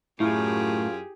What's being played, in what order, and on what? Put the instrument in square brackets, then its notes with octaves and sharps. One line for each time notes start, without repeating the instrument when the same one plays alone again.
[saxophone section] F#2 F4 [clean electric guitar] A2 [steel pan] E4 [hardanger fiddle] G4 G#4